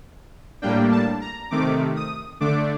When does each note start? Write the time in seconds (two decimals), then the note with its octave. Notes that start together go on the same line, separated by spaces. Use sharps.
0.62 A2 G3 A#3 D4 G5
0.92 A5
1.21 A#5
1.51 C3 D#3 A3 D6
1.96 D#6
2.40 D3 A3 D4 D6